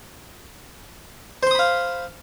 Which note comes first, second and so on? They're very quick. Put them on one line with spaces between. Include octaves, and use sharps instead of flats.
C5 C6 D#6 B5 F5